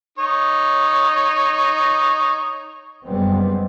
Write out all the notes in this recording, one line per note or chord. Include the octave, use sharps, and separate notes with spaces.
D#4 C#5
F#1 G3 G#3 B3 C4